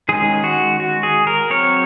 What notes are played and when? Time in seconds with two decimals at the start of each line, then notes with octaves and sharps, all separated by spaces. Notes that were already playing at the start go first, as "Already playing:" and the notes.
0.09 D#3 G#3 C#4 G#4
0.44 F#4
0.80 F#4
1.03 G#4
1.27 A#4
1.50 F#3 C4 C#5